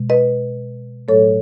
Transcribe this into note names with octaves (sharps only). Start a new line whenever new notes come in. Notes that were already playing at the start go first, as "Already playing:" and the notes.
Already playing: B2 G#3
B4 D#5
A2 F#3 A3 A4 C#5